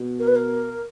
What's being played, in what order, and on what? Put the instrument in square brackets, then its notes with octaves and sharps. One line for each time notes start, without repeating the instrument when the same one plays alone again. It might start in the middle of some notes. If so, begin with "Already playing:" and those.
Already playing: [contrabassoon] B2
[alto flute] A#4
B4
A#4